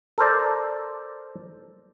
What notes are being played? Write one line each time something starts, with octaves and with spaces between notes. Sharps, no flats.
A4 A#4 C5 D5